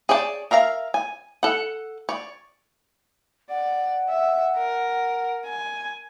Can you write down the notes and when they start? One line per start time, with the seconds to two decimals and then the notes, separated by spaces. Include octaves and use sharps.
0.09 G#4 C#5 D5 G5 A5
0.51 A#4 E5 F5 A#5
0.94 G#5
1.43 A4 F#5
2.09 C#5 D5
3.50 D5 F#5
4.09 E5
4.57 A#4
5.46 G#5